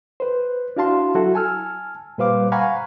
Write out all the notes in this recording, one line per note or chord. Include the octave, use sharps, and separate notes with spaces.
B4 C5
D4 E4 F#4 F5 A5 C6
F#3 E4 F#4 A4
G#5 A5 E6 F6
A#2 G3 B4 C5 F5 D6
F5 F#5 G#5 A#5 B5 C#6